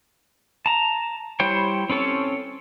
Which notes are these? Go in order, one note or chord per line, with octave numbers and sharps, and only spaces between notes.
A5 A#5
G3 E4 C5 C#5 G5
C4 C#4 A4 C#5